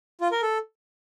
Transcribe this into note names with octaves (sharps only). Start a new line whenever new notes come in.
F4
A#4
A4